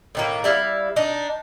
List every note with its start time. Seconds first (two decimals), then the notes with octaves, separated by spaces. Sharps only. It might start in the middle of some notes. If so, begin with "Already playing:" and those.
0.15 A2 D#3 A#3
0.44 G3 E4 E5 F5
0.96 D4 D#4